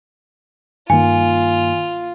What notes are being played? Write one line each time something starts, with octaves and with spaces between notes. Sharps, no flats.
G2 D#3 A#3 F4 G#5